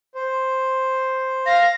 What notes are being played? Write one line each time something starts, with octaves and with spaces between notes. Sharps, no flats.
C5
F5 A#6